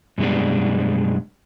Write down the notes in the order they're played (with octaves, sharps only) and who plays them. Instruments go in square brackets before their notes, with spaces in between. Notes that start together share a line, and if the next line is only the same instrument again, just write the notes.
[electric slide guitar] F#2 B2 G3 G#3 D4